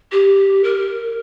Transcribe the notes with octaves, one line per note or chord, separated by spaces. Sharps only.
G4
A#4